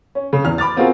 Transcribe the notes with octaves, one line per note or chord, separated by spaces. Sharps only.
C#4
C#3
E2 F6
B5 D6 F6 A6
B3 C4 F4 F#4 G#4 A#4